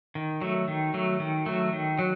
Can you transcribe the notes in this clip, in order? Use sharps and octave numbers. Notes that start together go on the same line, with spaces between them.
D#3
F#3 A3
D#3
F#3 A3
D#3
F#3 A3
D#3
F#3